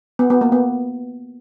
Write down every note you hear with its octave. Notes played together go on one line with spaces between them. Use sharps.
B3
B3
A#3
B3